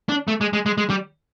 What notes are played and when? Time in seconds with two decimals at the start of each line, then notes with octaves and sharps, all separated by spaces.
0.09 D4
0.28 A3
0.41 G#3
0.53 G#3
0.66 G#3
0.78 G#3
0.90 G3